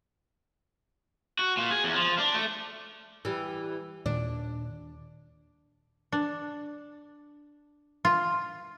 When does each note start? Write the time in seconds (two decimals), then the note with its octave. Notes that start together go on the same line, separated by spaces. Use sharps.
1.39 F#4
1.57 A#2
1.71 G#4
1.84 E2
1.96 F3
2.18 D4
2.34 A3
3.25 E3 G3
4.06 D#2 A#2 D#3 D4
6.12 D4
8.05 F4